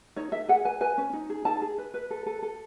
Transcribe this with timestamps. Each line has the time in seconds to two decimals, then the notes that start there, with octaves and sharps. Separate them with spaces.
0.16 D#4 C#5
0.32 A4 E5
0.48 G#4 F#5
0.65 B4 G#5
0.81 B4 G#5
0.98 C#4
1.13 D#4
1.30 G#4
1.45 D#4 A5
1.62 G#4
1.78 B4
1.94 B4
2.10 A4
2.26 A4
2.43 A4